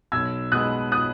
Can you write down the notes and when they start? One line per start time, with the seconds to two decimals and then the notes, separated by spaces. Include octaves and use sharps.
0.12 B1 E6 G#6
0.52 B2 G#3 B3 D#6 F#6
0.92 D#6 F#6